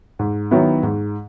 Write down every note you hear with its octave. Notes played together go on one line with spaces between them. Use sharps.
G#2
D#3 F#3 B3 E4
G#2